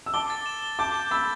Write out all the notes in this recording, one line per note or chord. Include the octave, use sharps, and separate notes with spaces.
E6
A5 D6 G7
A6
E7
G7
A5 D6 G6
G6
B5 E6 A6